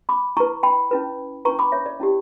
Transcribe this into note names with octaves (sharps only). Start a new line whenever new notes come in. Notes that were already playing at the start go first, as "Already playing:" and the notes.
B5 D6
E4 B4 A#5 C#6
G5 B5
C#4 E4 B4
C#4 E4 B4 A#5 C#6
B5 D6
C#5 E5
D5
C#4 E4 G4